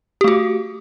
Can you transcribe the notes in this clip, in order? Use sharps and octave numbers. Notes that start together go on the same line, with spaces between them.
A3 F#4 G4